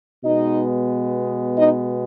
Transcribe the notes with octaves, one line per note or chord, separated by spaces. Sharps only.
B2 G#3 B3 D#4 D#5
D#4 D#5